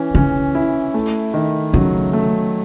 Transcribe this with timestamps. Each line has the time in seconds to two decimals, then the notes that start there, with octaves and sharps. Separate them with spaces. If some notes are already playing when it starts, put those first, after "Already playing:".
Already playing: E3 C#4
0.15 C#3 C#4
0.55 E4
0.94 A3
1.34 D#3
1.74 C#3 F#3
2.13 A3